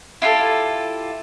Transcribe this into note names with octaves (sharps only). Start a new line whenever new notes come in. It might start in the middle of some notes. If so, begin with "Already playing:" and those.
E4 F4 G4 A4